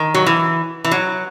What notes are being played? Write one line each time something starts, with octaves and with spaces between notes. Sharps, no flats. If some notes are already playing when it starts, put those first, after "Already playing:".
Already playing: D#3
F#3
E3
E3
F#3